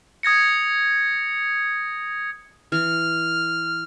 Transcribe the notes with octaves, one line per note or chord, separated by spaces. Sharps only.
D#6 G#6 A#6 C#7
E3 F6